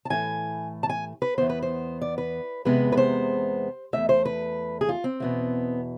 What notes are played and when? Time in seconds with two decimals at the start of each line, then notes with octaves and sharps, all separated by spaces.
0.05 A5
0.10 A2 E3 A3 G#5
0.83 A5
0.89 G#5
1.22 B4
1.38 E2 B2 B3 C5
1.50 B4
1.62 C5
2.01 D5
2.18 B4
2.65 E2 C3 G#3 B3 B4
2.92 B4
2.97 C5
3.93 E2 B2 A3 E5
4.09 C5
4.25 B4
4.81 G#4
4.89 F4
5.04 C4
5.20 E2 B2 B3